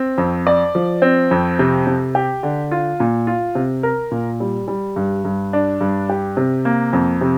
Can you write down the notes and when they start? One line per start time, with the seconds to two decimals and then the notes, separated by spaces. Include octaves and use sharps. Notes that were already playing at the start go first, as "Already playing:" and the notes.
Already playing: C4
0.18 F2
0.47 D5
0.75 F3
1.02 C4
1.31 F2
1.59 C3
1.87 C3
2.15 G4
2.43 D3
2.71 F4
3.00 A#2
3.27 F4
3.55 C3
3.83 A#4
4.11 A#2
4.40 G3
4.68 G3
4.96 G2
5.25 G2
5.53 D4
5.81 G2
6.09 G4
6.37 C3
6.65 A#3
6.93 F2
7.21 C3